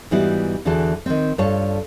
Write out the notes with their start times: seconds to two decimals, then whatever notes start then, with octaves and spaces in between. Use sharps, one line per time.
0.11 G#2 E3 G3 B3 E4 F#4
0.65 E2 D3 E3 F#4 G#4 A5
1.06 D#3 C4
1.38 G2 F4 A4 C#5 A5